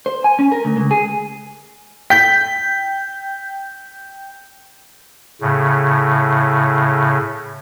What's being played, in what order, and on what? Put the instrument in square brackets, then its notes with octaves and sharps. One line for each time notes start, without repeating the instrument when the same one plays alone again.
[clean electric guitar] C5
G#5
C#4
A#4
D2
C#2
G#4
[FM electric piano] G5 G6 [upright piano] B6
[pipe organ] A2 C#3